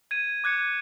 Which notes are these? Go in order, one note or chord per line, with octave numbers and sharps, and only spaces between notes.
G#6 D#7
D6 F#6 G#6 C#7